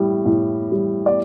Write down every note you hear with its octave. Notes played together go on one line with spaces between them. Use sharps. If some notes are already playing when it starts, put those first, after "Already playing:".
Already playing: A2 G3
A2
G3
D5